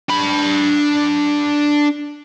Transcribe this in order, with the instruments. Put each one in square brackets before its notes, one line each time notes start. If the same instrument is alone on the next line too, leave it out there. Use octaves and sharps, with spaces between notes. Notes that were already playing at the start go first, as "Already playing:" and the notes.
[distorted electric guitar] D4 B5